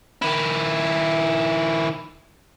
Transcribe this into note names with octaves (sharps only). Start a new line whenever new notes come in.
D#3 E4